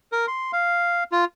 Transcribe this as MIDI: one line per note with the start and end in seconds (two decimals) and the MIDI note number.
0.12 0.26 70
0.27 0.52 84
0.53 1.04 77
1.12 1.25 65